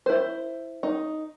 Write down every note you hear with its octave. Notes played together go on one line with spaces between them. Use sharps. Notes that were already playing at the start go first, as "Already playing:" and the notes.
E4 C5
D#4